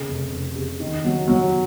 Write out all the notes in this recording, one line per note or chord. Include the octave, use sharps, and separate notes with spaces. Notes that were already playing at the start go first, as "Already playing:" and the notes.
Already playing: C#3
F1
F1
C#3
D#3
F#3
F#3